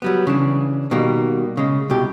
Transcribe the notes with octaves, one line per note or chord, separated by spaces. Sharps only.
F#3 G3 B3
C#3 E3 D4
B2 D#3 G3 A#3
C#3 G#3
C2 B2 G4